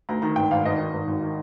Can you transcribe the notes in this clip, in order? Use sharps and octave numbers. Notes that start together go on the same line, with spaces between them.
D2 A#5
D#3 A#5
G#1 G5
G#1 F5
G#1 D#5
D#3
G#1
G#1
D#3